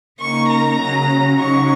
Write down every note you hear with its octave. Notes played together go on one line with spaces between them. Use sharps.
C#3 A#3 D#4 C#6
A#5
C#3 F#3 C#4
C#3 F#3 D#4 C#6